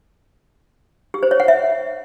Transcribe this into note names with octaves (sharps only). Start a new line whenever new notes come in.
G4
C5
C#5
F#5
E5